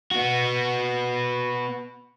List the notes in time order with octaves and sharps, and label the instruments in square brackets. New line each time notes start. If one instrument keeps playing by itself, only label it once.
[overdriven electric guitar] B3 F#4